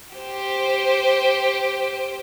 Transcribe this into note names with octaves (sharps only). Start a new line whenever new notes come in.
G4 C5